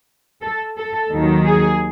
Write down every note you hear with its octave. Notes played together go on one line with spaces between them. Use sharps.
A4
A4
D#2 D#3 F#3
G#4